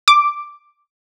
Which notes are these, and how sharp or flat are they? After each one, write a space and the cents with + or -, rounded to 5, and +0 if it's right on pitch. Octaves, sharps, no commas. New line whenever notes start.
D6 +0